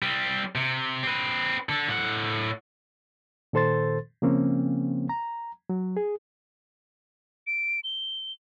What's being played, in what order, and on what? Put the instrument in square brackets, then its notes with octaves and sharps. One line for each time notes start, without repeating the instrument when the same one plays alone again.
[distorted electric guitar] G3 C4
C3
C4 B4
D3 A4
A2 F#5
[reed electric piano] A#2 D#3 A4 C5 C6 A6
C#3 F3 A#3 C4 C#4
A#5
F#3
G#4
[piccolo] D7
G7